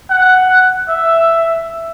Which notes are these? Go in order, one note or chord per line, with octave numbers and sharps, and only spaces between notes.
F#5
E5